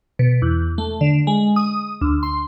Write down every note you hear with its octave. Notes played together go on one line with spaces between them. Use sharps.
B2
E2
A3
D3
G#3
D#6
D2
C6